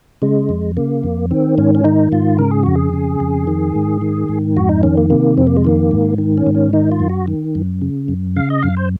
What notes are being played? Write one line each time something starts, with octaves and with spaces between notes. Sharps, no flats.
C#3 G#3
F2
C#3 A#3
F2
D#3 C4
G#2 C#4
C#4
D#3 D#4
G#2 F4
C#3 A#4
G#4
F2 F#4
G#4
C#3
F2
D#3
G#2
D#3
G#2
F2 F#4
D#4
D#3 C#4
A#3
C3 A#3
F2 C4
A#3
G#3
D#3 A#3
G#2
D#3
C#4
G#2
C#4
D#3 D#4
F4
F#2
F#4
D#3
F#2
C#3
F#2
C#3 F5
D#5
F#2 F5
C5